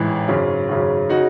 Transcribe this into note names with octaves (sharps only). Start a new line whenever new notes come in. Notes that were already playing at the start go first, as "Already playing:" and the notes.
Already playing: A1 G#2 E3
G#1 F#2 C#3
G#1 F#2 C#3
C#3 D#4 F#4